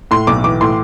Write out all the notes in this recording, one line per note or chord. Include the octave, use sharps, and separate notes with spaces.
A2 C6
B1 D6
E3 D6
A2 C6